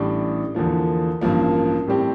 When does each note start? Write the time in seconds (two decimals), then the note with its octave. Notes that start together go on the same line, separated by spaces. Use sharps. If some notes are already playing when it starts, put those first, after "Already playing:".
Already playing: A1 A2 G3 D4
0.55 E2 D3 F3 A#3
1.21 A1 G2 F3 A#3
1.87 A2 G3 C4 G4